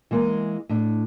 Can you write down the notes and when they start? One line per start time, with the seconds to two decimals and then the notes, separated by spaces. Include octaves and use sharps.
0.11 E3 G#3 A#3
0.69 A2 D4